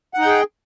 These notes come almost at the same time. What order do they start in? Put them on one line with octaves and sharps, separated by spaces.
F#5 D#4 G5 G#4